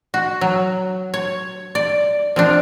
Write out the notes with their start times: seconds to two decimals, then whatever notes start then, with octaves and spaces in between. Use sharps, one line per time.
0.14 F#4
0.41 F#3
1.14 C#5
1.75 D5
2.36 F3 C4 D4